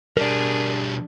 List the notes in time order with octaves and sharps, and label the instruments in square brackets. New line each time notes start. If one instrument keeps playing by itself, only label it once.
[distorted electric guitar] B2 G3 [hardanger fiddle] D4 G#4 [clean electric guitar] A#4 D5